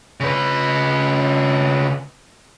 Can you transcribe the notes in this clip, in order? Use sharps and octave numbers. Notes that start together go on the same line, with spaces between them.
C#3 B4